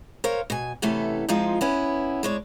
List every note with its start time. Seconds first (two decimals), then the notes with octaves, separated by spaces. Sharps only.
0.24 A#4 C5 C#5 F5
0.50 B2 G#5
0.82 C3 E3 A3 B3 C#4 A4
1.29 F3 G#3 C4 D#4 F4
1.61 B3 C#4 E4
2.23 G#3 D4 C#5